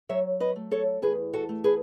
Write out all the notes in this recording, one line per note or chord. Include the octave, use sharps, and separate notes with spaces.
F#3 C#5 E5
B4 D#5
A3
A4 C#5
E2 G#4 B4
F#4 A4
A3
G#4 B4